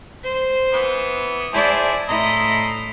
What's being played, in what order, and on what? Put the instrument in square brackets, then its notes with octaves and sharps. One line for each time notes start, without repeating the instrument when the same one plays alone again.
[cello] C5
[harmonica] E3 B3
[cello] E4 D5 [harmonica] G#4 C5 A5
[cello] A2 E4 [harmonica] D#5 A#5 C6